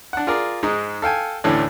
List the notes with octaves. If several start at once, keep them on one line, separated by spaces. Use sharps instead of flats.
D4 F#5
F4 G#4 A#4 D5
G#2 G#3 D#4
A4 F5 G5 G#5
D2 A2 E3 A3 C#4 D4